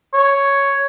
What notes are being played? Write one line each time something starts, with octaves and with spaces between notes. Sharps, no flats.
C#5